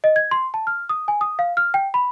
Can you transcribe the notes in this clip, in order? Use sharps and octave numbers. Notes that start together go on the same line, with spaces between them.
D#5
G#6
C6
A5
F6
D#6
G#5
D#6
F5
F6
G5
B5